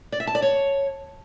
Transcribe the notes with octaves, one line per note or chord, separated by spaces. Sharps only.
D5
E5
A5
D5
C#5